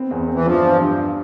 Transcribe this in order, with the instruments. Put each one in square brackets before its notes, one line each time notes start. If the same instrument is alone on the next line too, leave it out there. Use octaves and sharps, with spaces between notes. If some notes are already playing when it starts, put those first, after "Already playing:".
Already playing: [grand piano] B3 C4
E2
C4
[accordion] E3
[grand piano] G2 [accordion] F3
[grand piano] G2
G2